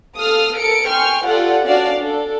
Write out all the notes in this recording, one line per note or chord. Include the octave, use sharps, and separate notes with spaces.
A4 F5 D#6 F6
A4 A#4 C#7 D7
G5 G#5 C6 C#6 F6
F4 G4 A4 D5 F#5
C#4 D4 F#4 D5 F5
D4 A4